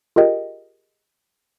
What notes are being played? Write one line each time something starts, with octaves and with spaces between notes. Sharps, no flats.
F4 G4 G#4 A#4 D#5 G5